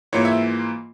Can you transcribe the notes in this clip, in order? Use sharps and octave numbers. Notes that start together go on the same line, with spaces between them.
G#2 E3 A#3 F4 C#5
E5